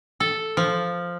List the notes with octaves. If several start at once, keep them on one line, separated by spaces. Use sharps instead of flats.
A4
F3